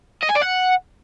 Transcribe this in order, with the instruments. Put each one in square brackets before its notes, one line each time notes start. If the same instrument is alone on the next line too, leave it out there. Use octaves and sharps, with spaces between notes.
[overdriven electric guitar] D#5
G#5
D5
F#5